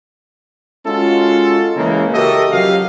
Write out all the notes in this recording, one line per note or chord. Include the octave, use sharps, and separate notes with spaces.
G#3 C#4 F4 F#4 A4
C#3 E3 G#3 A#3
F#4 G4 A4 A#4 D#5 E5
C#3 F3 F#3 G4 F5